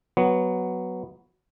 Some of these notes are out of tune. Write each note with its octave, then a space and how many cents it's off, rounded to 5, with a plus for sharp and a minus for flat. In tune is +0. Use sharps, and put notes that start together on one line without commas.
F#3 +0 B3 +0